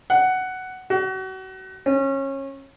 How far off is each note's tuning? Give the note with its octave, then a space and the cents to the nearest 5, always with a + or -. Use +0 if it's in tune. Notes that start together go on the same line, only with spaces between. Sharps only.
F#5 +10
F#4 +35
C#4 -25